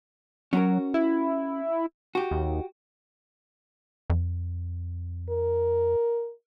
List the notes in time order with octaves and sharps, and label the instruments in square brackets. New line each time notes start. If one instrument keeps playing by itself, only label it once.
[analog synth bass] F#3 [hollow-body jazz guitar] C#4 F#4 A#4
[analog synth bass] E4
[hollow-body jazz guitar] F#4 G4
[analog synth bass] D#2
F2
[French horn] A#4